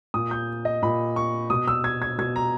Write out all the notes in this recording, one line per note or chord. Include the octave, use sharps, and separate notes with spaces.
A#2 D#6
G6
D#5
A#2 B5
C#6
B2 D#6
E6
G#6
G#6
B2 G#6
A#5